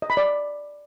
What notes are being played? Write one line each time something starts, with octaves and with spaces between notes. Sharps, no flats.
D#5
B5
D5